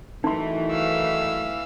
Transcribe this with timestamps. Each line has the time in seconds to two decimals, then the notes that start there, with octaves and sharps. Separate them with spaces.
0.24 D#3 E3 F#3 A3 D#4 C6
0.71 F5 E6